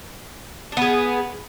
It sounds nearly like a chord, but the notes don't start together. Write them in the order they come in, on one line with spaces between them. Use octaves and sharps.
D4 B3 G#4